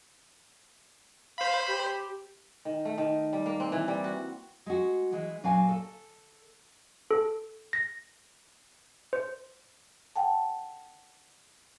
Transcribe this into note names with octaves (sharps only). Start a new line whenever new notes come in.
C5 F5 B5
G4
D#3
A3
D#3
G3
A#3
C4
E3
G3
F#4
G#3 F#4
E3 G#3
A#2 F#3 B4 F5 G#5
A4
A4
A#6
C5
F#5 G5 A5